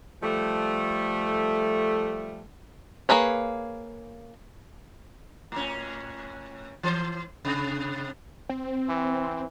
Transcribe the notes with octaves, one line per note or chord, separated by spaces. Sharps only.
F3 G3 A3
A#3 G#4 B4 C#5
A2 C#4
E3 C5
C3
C4
E3